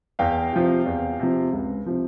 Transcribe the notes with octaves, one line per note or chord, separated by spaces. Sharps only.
E2 F5 G5
C3 F3
E2
C3 F3
C#2
C3 F3